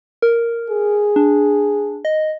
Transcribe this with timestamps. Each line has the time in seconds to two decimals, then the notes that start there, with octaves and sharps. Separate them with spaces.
0.22 A#4
0.70 G#4
1.16 D4
2.05 D#5